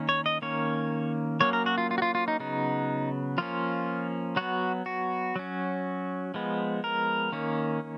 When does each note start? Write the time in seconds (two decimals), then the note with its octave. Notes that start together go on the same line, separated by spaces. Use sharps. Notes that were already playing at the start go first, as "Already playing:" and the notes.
Already playing: D#3 A#3 C#4
0.09 C#5
0.26 D#5
0.42 D#3 A#3 C#4 C#5
1.40 F#3 A#3 C#4 C#5
1.53 A#4
1.66 F#4
1.78 F4
1.91 F4
1.98 F#4
2.02 F4
2.15 F4
2.28 D#4
2.40 C#3 F#3 B3 D#4
3.38 F3 A#3 C#4 F4
4.36 F#3 B3 F#4
4.86 F#4
5.36 F#3 C#4
6.34 F3 G#3 B3
6.84 A#4
7.32 D#3 A#3 C#4